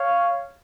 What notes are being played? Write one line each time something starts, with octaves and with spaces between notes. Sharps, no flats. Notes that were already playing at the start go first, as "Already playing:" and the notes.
Already playing: C#5 F5